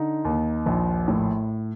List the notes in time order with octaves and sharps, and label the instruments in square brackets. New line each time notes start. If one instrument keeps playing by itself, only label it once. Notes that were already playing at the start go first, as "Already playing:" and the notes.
Already playing: [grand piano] D3 D#4
D#2
A#1
A2